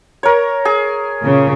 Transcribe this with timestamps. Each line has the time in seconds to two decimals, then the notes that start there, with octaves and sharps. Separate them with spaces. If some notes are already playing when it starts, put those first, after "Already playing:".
0.23 A#4 C#5
0.65 G#4
1.23 A#2 C#3